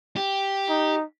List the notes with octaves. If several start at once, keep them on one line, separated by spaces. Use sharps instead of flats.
G4
D#4